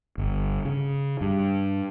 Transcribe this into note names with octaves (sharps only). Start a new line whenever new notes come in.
G1
C#3
G2